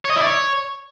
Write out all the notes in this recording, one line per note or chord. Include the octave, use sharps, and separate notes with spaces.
C#5
D#5
E4
D5
C#5